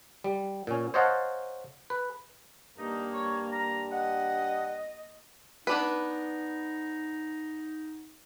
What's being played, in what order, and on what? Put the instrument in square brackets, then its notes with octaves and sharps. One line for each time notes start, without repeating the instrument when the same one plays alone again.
[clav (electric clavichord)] G3
A#2 C#4
C5 C#5 D#5 F5 F#5 A5
B4
[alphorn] G2 [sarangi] A#3 [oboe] D#4
[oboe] C#5
A#5
[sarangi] D#5 [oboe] F#5
[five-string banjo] B3 D4 B4 [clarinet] D#4